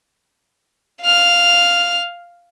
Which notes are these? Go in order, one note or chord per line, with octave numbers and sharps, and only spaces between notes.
F5 F6